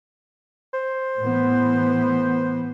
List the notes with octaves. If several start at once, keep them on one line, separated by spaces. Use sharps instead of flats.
C5
A2 E3 B3